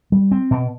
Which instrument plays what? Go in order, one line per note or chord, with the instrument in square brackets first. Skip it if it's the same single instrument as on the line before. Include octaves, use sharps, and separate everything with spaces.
[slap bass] G3
C4
B2